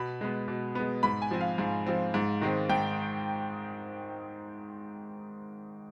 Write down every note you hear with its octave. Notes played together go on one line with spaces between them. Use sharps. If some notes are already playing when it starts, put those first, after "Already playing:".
Already playing: B2 B5
G#3 B3
B2
G#3 B3
G#2 B5
G#5
F3 C4
F5
G#2
F3 C4
G#2
D#3 G#3 C4
G#2 G5